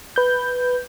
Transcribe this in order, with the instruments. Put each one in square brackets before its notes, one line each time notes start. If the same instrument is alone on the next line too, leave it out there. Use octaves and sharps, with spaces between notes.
[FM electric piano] B4 G6